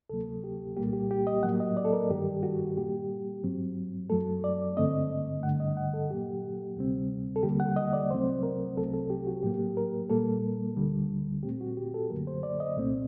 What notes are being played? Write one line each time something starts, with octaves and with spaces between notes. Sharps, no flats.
D2 C3 F#3 A#3 A4
G4
C2 A#2 G3 A#3 G4
G4
G4
D#5
A2 F#3 A#3 F#5
D#5
D5
A4
A#4
G2 D#3 G3 G4
F#4
A#2 G3 A#3 G4
G2 F#3 C4
F#2 F#3 A3 A4
D5
G2 D3 A3 C4 D#5
G2 D3 G3 F#5
D#5
F#5
A4
A#2 F#3 A#3 G4
D2 C3 G3 C4
A4
D#2 D3 G3 A#3 G4
F#5
D#5
D5
C2 C3 F#3 A3 C4 C5
A#4
C2 C3 F#3 C4 A4
A4
G4
F#4
A2 F#3 A#3 G4
A#4
A#2 G3 A#3 A4
D2 D3 G3
A#2 A3 C4 G4
F#4
G4
A4
F#2 D3 F#3 A#3 A#4
C5
D5
D#5
C2 A#2 A3 C4